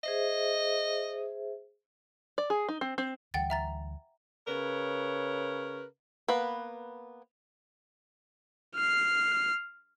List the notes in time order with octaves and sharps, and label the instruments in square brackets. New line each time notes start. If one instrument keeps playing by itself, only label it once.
[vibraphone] G#4 C5 E5 [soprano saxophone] D#5
[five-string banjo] D5
G#4
D#4
C4
C4
[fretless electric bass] D2 E3 G3 [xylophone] F#5 G5 A6
[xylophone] E5 A#5 A6
[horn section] C#3 A#4 B4 C#5
[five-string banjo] A#3 B3 B4
[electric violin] F6 C7